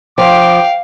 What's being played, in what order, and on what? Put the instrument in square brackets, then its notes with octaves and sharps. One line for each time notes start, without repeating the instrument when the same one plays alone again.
[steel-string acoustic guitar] F3 [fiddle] F5 [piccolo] G5 [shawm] D6